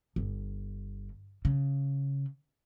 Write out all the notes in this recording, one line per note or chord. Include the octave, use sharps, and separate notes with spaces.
G1
C#3